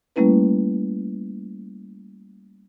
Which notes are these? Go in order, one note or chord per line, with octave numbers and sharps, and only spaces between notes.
G3 A3 A#3 C#4 E4 B4